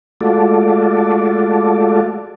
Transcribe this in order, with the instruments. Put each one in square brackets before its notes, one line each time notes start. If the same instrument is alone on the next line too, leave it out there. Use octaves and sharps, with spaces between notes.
[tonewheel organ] G#3 A3 F4 F#4 A4 D5